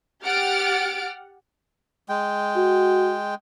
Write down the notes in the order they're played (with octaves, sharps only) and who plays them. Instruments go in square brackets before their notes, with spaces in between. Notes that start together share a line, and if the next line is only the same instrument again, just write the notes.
[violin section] G4 F#5 F6 A6 D7
[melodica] G#3 G5
[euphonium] F#4